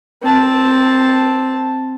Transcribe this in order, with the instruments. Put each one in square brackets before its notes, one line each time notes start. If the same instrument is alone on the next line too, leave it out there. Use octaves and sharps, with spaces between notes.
[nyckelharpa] C4 A5